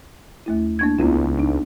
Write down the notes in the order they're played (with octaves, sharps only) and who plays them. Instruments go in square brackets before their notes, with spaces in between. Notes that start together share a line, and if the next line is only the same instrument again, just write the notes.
[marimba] D#2 A3 E4
A#3 D4 G#6
[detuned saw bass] C#2 [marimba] B3 E4 F4
[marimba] D4 D#4